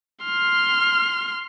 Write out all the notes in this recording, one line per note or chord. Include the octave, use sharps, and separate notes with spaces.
C6 F6